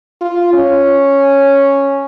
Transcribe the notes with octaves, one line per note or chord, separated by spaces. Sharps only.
F4
C#4